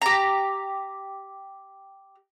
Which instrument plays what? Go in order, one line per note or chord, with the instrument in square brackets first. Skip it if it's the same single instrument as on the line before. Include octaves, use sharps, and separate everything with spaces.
[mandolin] G4 A#5